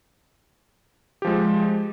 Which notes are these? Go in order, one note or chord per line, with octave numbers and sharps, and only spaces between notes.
F3 G#3 G4